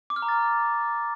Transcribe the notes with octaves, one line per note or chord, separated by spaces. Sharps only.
D6
F6
A#5
A6